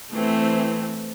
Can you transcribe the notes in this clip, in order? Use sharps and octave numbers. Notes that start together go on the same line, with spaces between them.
E3 A3 C4